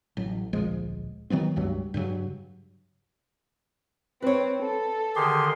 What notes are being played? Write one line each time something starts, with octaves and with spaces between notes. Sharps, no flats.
A1 F#3
D1 A#1 F3 G#3
D#3 F#3 B3 C4
C#2 G2 F#3
G2 C#3 F#3
C4 B4 C#5
A4
D3 D#3 G4 G#4 C6